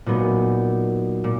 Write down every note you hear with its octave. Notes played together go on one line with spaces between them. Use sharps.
A#2 F#3 B3 D#4
A#2